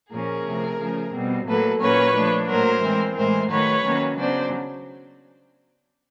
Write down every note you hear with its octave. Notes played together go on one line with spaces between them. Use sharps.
A#2 F3 A#3 C#4 G#4 A#4
C3 F3 A3
C#3 F3 A3
B2 G3 C4
A2 F#3 A#3 A4 B4
A#2 F#3 A#3 C#4 B4 C#5
F3 A3 D4
A2 F#3 A#3 A#4 C5
E3 G#3 C4
A2 E3 G#3 A#4 C5
D#3 F#3 A3 B4 C#5
D#3 F#3 A#3 C#4
C#3 F#3 B3 D4 C5 D5